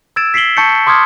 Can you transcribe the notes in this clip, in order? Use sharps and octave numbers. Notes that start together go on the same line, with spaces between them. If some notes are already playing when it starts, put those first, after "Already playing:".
E6 G#6 A6 D7 E7
B6 C7 D7 F#7 G7
A5 C#6 G6 A6 C#7
C6 D6 D#6 F6 G#6